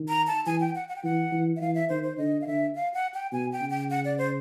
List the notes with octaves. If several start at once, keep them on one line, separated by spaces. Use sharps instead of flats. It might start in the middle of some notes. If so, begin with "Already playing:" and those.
Already playing: D#3
A#5
A5
E3 G#5
G5
F#5
F#5
G5
E3 F#5
E3
E5
E3 F5
E5
D#3 C5
C5
D3 D#5
F5
D3 E5
F5
F#5
G5
B2 G#5
G5
C#3
G5
F#5
D5
C5